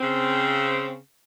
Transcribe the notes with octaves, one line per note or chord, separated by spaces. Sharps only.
C#3 C4